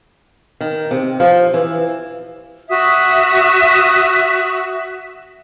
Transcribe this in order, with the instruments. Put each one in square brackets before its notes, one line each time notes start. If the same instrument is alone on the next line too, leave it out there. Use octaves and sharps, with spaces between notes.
[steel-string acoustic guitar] D#3
C3
F3
E3
[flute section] F#4 E5 D#6